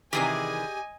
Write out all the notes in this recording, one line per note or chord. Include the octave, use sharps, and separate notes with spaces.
C3 D#3 E3 G4 G#4 D5 D#5 G#5